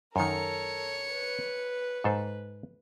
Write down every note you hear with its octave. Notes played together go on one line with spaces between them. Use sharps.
F#2 D#3 A4 A#4 C#5 C#7
B4
G#2 A4 C5